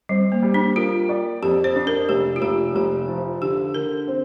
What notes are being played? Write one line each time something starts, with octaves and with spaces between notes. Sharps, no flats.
G3 C4
A#3
G3
D4
A#3 F4
D5
F2 G4
C5
D4
A#4
F1 G4
F4
F1 G4
F1 G4
F3
D3 G4
D3 A#4
C4